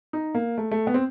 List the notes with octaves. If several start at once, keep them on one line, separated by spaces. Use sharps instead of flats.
D#4
A#3
A3
A3
B3
C4